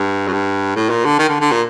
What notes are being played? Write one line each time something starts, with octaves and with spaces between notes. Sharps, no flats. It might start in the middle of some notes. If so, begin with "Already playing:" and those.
Already playing: G2
F#2
G2
A2
A#2
D3
D#3
D3
D3
A#2